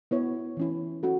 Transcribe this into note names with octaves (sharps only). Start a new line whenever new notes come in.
B3 E4 C#5
E3 C#4 E4
C#4 F#4 A4